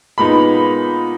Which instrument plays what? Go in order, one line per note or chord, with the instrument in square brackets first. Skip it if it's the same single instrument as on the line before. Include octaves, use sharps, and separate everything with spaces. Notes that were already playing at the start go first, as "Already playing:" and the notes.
[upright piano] A#2 G#3 B3 D#4 B5